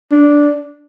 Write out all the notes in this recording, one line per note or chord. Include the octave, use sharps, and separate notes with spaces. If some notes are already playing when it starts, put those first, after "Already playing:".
D4